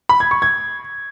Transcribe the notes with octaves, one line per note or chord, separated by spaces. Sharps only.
B5
G#6
C#6
G#6